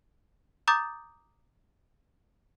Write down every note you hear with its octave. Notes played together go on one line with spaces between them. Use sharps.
A#5 D6 D#6 G6 A6